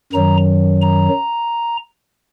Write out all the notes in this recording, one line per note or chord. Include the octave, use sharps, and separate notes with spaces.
F#2 D#3 F#3 A#5
A#5